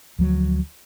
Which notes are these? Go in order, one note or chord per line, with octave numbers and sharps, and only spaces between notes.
D2 F3 F#3